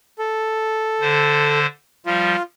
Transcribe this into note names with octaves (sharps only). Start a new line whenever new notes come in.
A4
D3 C5
F3 G3 F4